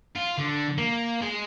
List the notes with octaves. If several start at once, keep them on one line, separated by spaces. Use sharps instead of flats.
F4
D3
A#3
G#3